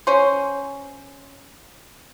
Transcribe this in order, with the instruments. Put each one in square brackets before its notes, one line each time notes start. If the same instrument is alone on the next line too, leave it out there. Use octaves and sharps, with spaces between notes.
[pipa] C#4 C5